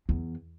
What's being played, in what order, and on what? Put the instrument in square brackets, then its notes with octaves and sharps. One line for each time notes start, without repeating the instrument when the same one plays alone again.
[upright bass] E2